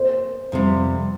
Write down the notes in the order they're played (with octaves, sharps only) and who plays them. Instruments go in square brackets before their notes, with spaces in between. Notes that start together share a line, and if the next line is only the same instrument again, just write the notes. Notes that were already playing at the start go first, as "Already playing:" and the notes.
Already playing: [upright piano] C5
[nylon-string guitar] F2 C3 G3